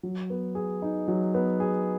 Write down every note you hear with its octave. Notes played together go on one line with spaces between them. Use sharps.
F#3
B3
G#4
D#4
F#3
B3
G#4